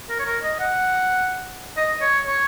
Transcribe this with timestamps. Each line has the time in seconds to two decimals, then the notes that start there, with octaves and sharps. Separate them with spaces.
0.09 A#4
0.19 C#5
0.26 A#4
0.43 D#5
0.59 F#5
1.77 D#5
2.01 C#5
2.27 C#5